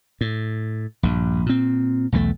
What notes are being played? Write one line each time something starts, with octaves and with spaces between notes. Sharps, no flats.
A2
A#1 G2
A#2 C4
B1 E2 E3 A3